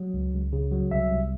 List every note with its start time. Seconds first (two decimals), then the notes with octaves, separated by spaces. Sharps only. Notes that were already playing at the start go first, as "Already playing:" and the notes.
Already playing: F#3
0.14 C#2
0.33 C#2
0.53 C#3
0.72 F#3
0.91 C2 E5
1.11 C2